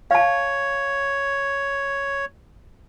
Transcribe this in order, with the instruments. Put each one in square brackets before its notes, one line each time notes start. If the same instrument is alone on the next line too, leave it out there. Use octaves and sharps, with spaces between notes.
[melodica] C#5 [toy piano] F5 A5